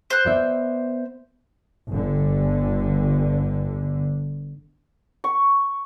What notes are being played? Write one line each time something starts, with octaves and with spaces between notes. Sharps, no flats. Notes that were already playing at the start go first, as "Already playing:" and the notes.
C5 F#6
B3 D5 E5
G1 D3
C#6